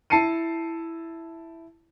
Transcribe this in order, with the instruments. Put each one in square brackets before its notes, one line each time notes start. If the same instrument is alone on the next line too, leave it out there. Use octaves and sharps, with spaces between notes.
[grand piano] E4 A5 C7 C#7 D#7